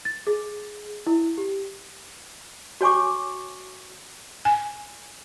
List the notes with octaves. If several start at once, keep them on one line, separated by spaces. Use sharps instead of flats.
A6
G#4
E4
G4
F#4 C#5 G#5 C#6 D6
G#5